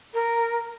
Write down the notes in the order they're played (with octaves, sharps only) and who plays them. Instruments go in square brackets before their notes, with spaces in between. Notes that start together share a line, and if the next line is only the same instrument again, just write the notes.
[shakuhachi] A#4